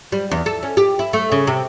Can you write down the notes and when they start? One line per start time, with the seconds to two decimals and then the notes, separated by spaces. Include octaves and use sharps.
0.12 G3
0.31 E2
0.46 A4
0.63 C#4
0.77 G4
0.99 E4
1.13 A3
1.32 C#3
1.47 C3